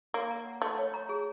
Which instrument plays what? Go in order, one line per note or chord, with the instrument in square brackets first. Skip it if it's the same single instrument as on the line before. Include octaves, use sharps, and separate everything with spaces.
[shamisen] A#3 [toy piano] C#5
[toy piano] A#5
F#5
[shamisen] A3 [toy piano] A4
[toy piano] C#5
A#5
G#4